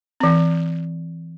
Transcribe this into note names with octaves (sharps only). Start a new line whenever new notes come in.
E3 C4